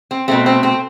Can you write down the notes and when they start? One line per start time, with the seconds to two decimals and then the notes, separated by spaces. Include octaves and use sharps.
0.11 C4
0.28 B2 A3 C4
0.46 C4
0.63 C4